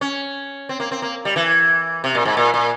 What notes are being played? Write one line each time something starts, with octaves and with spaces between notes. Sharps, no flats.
C#4
C4
A#3
C4
A#3
G3
E3
C3
A#2
G#2
A#2
A#2